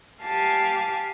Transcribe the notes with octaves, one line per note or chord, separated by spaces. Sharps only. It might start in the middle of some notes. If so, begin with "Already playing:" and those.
G4 F5 G#5 A5